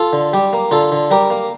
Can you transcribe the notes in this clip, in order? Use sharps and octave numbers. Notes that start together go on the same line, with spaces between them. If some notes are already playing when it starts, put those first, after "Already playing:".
Already playing: F4 A4
D3
G3 G4
A#3
D3 F4 A4
D3
G3 G4 A#4
A#3